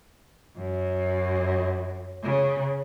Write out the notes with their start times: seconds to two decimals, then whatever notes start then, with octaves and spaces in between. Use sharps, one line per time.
0.57 F#2
2.23 C#3